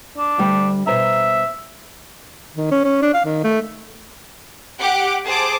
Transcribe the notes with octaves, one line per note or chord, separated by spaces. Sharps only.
D4
D2 G3
B2 C5 E5 A#5
D#3
C#4
C#4
D4
F5
D#3
A3
G4 F#5 D6
G#4 C5 A5 D6